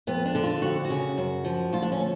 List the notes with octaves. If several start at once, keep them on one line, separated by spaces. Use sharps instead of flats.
F2 B3
D4
D3
F4
F2 F#4
F#4
C#3
F#2
F3
D2 F4
D4
C#4